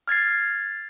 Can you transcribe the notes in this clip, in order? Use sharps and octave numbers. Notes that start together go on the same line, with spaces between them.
F6 G#6 A6 C7